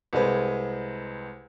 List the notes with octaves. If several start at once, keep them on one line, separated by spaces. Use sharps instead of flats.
C2 G#3 C4 B4